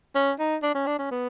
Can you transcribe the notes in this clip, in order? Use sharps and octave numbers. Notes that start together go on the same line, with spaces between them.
C#4
D#4
D4
C#4
D4
C#4
B3